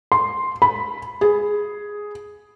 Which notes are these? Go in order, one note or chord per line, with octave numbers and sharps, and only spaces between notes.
C6
B5
G#4